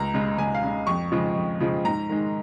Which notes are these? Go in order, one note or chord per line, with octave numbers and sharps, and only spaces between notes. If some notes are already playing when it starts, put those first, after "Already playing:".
Already playing: C#2 A#5
C#3 G#3
C#2 G#5
F5
C#3 G#3
F2 C#6
C#3 F3 G#3
F2
C#3 F3 G#3
G#2 A#5
D#3 G#3